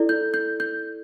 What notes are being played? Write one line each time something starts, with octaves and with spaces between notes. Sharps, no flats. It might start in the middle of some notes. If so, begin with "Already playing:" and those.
Already playing: E4 A4 D5
G6
G6
G6